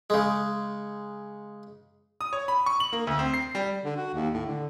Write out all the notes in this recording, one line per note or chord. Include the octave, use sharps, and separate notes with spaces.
C#3 G#3
D#6
C#5
B5
C#6
F#7
A#3
D2
C4
C7
G3
D3
F#4
D#2
A2
D3